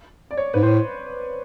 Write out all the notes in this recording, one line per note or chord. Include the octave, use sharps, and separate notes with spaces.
D5
C#5
G#2 B4
A2 C5